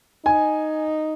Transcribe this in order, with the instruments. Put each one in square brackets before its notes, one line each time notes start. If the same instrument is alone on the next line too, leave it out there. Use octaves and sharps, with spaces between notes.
[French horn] D#4 [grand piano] G#5